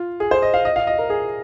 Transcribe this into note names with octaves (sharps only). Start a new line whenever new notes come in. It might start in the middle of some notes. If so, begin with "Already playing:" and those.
Already playing: F4
G#4
C5
D#5
F5
D#5
F5
D#5
A#4
G#4